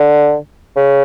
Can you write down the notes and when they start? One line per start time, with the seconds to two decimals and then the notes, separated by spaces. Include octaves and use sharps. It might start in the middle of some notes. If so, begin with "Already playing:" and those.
Already playing: D3
0.76 C#3